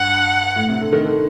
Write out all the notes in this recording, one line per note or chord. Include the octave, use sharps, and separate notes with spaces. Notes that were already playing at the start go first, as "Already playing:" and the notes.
Already playing: G2 F#5
A2
C3
D3
D#3
D3